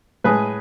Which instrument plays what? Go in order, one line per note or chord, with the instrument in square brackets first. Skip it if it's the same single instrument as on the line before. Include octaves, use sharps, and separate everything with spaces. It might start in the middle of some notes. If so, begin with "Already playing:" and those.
[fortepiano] A2 G#3 G#4 B4